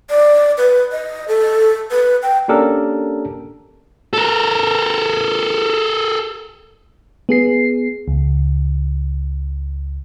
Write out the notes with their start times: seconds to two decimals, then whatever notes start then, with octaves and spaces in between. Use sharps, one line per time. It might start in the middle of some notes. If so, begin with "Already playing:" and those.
0.09 D5
0.58 B4
0.92 D#5
1.28 A4
1.91 B4
2.22 G5
2.48 A#3 C#4 D4 G4 A4 A#4
4.13 A4 A#4
7.29 B3 G#4 C7
8.08 C#2